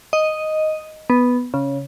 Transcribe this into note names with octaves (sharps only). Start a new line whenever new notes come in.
D#5
B3
C#3